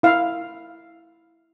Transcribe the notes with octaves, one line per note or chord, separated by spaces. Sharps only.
E4 F5